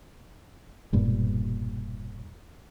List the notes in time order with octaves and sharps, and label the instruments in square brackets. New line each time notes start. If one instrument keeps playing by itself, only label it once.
[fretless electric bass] E1 G2 A#2